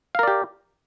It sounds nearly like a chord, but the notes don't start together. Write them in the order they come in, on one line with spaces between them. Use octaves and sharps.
F5 A#4 D5 G4